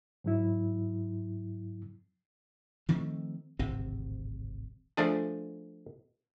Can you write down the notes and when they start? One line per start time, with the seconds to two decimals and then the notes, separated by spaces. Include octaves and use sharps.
0.24 G#2 F#3 E4
2.89 D#3 F3 A3 C4
3.59 D1 G#1 C3 C4
4.97 F3 A3 D4 G#4